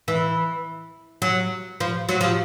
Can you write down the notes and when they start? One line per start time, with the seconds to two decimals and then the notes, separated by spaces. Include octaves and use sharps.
0.08 E3
1.22 F#3
1.80 F3
2.09 F#3
2.21 F3